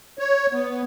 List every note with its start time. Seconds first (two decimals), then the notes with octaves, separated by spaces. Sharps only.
0.19 C#5
0.52 B3